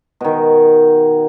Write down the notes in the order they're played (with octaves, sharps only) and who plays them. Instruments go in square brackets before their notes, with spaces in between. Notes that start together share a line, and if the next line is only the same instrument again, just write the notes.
[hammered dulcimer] B2 D#3